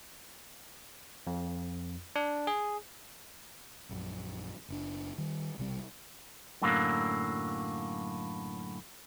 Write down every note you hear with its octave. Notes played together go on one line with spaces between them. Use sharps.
F2
D4
G#4
A#1 F#2
F#1 D4
D#3 G3
B1 C3 G3
F#2 A2 D3 F#3 A#3